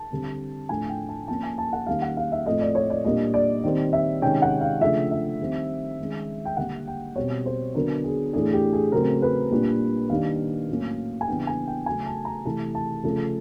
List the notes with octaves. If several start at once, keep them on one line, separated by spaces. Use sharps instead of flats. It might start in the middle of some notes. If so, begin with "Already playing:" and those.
Already playing: A5
D3 G3 C4
A2 F3 A3 D4 G#5
G5
A5
F3 A#3 C#4 A5
G#5
A5
F#5
D#3 G3 A#3 C#4 F5
F#5
F5
E5
A2 F3 A3 C4 D#5
D5
C#5
D5
A#2 G3 A#3 D4 D#5
D5
D#3 G3 C4
E5
C3 D#3 G#3 C#4 G5
F#5
F5
C#3 F3 A3 D4 E5
E5
D#3 G3 C4
D#3 G#3 C#4
G5
D3 G3 A#3 F#5
G5
B2 G3 C4 C#5
C5
D3 F#3 B3 D4 A#4
G#4
A2 E3 A3 D4 G#4
G4
G#4
C#3 F#3 A3 C4 A#4
B4
A#2 G3 A#3 D4
D#3 G3 A#3 D4 F5
A2 F#3 A#3 C#4
G#5
C#3 E3 G3 B3 D4 G5
G#5
G5
C#3 F#3 A3 G#5
A5
A#5
C3 E3 A3 A5
A5
C#3 F3 A3 C#4